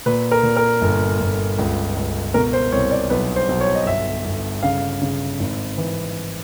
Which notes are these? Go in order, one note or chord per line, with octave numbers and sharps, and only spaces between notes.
A#2 B4
A#4
A#2
A#4
G1
G1
C#2
C#2
B2 A#4
C5
C2 C#5
D5
B1 B4
C5
B1
C#5
D#5
G1 E5
G1
C#3 F5
C#3
G#1
E3